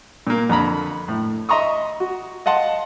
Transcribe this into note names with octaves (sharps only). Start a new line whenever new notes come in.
A#2 A#3
F2 D3 A#5 B5
A2
D#5 E5 A#5 C6 C#6 D#6
F#4
D#5 F5 F#5 A5 C6